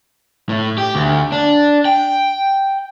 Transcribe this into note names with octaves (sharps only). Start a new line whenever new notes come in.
A2
G4
D2
D4
G5